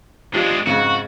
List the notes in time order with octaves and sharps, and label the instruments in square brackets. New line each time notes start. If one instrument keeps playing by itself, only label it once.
[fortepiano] F3 G4 [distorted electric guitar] G#3 D4
[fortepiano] F2 G#2 C#3 [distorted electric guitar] F#4